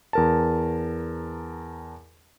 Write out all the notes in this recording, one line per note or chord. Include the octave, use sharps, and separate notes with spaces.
E2 A#4 A5